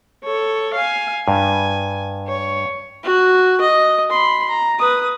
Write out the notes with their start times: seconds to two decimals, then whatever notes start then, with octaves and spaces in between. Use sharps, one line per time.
0.24 A4 C#5
0.75 F5 G#5
1.28 G2 G#5
2.28 C#5
3.04 F#4
3.61 D#5
4.10 B5 C6
4.49 A#5
4.79 B4 D#6